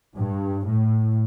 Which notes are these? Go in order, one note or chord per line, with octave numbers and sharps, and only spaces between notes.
G2
A2